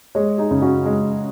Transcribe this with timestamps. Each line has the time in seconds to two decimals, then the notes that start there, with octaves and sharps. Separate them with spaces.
0.15 G#3 G#4 C#5
0.38 D#4 G#4
0.51 C#3
0.62 C#4 F#4
0.85 G#3